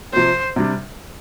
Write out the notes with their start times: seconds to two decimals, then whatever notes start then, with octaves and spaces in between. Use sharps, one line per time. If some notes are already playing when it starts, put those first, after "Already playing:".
0.13 C3 F3 C4 C5
0.56 C3 G3 D4